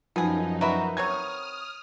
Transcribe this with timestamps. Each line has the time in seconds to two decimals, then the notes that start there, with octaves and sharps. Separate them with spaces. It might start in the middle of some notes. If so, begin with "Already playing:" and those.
0.16 F#2 F3 B3 D#4 G#4
0.61 F#4 A#4 B4 E5
0.97 F#3 C4 C#5 D#6 F6 G#6